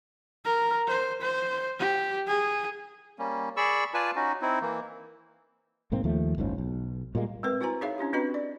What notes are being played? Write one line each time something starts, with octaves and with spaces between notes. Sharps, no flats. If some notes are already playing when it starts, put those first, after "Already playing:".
A#4
C5
C5
G4
G#4
G3 A#3 C#4
G#4 D5 B5 C#6 E6
F4 B4 D5 G#5 A5
C#4 D#4 F#4
C4 D#4 E4
E3 A#3
B1 G#2 A#3 C4
D#2 F3 A3
F#1 C#2 G#2 C#3
B1
A#2 G3 G#3 A#3
G#3 C4 A#4 B4
E4 F#4 B4 C5 G#5 A#5
D#4 G#4 C#5 E5 F5
C#4 D4 E4 G4
C4 D4 F#4 B4 D#5 B5
D5